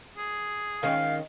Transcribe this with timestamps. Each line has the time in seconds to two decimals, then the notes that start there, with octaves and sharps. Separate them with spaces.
0.17 G#4
0.83 D#3 G#3 C#4 F5